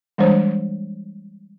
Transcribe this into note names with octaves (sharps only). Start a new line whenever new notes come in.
E3 G3 G#3 D4 C5 C#5